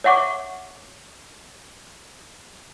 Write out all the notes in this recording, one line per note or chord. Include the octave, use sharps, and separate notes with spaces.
C#5 E5 F#5 C#6 D6